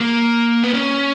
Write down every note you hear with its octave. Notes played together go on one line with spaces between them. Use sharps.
A#3
B3
C#4